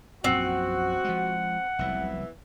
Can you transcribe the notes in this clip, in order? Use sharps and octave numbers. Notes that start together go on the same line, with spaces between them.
A#1 F#2 A#2 C4 F#4 F#5
F3 G#3
F1 C2 E3 F#3 B3 E5